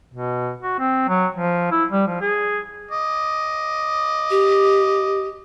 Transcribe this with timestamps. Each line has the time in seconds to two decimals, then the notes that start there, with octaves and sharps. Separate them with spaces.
0.14 B2
0.63 F#4
0.79 C4
1.09 F#3
1.35 F3
1.71 E4
1.91 G3
2.07 F3
2.21 G#4
2.91 D#5 D6
4.30 G4